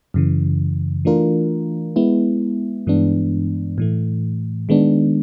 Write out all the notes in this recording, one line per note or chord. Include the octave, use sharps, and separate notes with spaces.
F#2 C#3 E3
E3 A3 D4 F4 A#4
G#3 B3 E4
G2 E3 G#3 B3 D4
A2 E3 A3
D#3 G#3 B3 D4